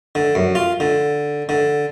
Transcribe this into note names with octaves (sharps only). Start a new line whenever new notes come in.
D3
F#2
F4
D3
D3